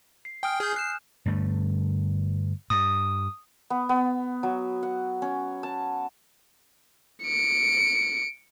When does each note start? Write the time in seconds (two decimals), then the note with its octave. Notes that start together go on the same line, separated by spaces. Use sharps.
0.25 C7
0.43 G5 G#5 D#6 F6
0.60 G#4 F6 G6
0.76 F#6 G6 C7 E7
1.26 G2 D3 A3
2.70 G2 D#6
3.70 B3
3.89 B3
4.43 F#3
4.83 F#5
5.22 C#4
5.63 A5
7.24 C#7 D7